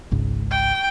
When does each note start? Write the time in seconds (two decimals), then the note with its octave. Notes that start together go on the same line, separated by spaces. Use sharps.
0.11 G#1 C#2 G#2
0.51 G5